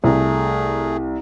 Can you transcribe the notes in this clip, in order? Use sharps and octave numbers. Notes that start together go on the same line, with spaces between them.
C2 A3 G#4